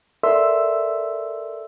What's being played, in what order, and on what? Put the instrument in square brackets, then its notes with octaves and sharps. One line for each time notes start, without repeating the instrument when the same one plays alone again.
[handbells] A4 A#4 D5 E5 C6 E6